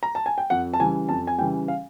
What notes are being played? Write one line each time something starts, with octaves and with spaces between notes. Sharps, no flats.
A#5
A5
G#5
G5
F2 F#5
A5
C#3 E3 G3 G#5
F2 A5
G#5
C#3 E3 G3 G5
F5